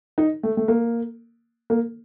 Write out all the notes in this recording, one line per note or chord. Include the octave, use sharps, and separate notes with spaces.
D#4
A3
A3
A#3
A#3